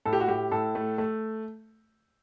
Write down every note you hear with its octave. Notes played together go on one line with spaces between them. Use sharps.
A2 A4
G4
F#4
A2 G4
A2 A4
A3
A3